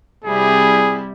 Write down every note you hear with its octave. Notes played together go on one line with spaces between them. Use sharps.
C3 G3 E4 G#4